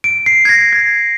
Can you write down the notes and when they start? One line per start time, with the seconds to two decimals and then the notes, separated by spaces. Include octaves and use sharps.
0.04 D7
0.26 C7
0.45 G#6
0.49 A#6
0.73 G#6